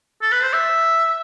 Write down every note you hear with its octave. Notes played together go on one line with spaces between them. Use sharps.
A4
B4
C5
E5